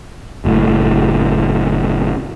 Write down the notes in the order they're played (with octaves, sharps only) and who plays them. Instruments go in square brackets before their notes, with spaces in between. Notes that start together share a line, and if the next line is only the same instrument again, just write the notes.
[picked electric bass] F#1 A2